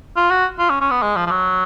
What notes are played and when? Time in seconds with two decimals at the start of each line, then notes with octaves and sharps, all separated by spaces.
0.17 F4
0.31 F#4
0.59 F4
0.70 C#4
0.81 C#4
0.91 B3
1.02 G#3
1.16 F3
1.27 F3
1.31 F#3